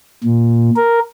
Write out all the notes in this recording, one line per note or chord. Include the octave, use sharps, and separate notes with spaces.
A#2
A#4